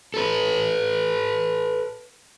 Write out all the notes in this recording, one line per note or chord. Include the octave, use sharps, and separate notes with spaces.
A4 B4